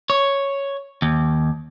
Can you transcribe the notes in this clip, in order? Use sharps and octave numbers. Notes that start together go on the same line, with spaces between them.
C#5
D#2